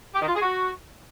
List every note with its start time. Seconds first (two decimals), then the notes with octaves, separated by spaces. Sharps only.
0.15 G4
0.21 D#3
0.28 F4
0.35 G#4
0.42 F#4